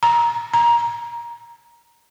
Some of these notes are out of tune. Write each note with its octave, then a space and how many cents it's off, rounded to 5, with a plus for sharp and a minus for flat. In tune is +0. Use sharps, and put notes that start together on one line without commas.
A#5 +10
A#5 +20